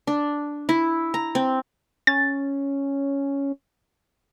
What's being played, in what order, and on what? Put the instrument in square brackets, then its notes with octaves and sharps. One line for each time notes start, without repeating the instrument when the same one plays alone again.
[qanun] D4
E4
A#5
C4
[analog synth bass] C#4 [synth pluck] A6